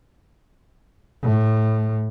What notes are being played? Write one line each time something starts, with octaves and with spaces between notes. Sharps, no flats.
A2